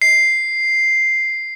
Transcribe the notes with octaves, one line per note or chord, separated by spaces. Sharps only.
C7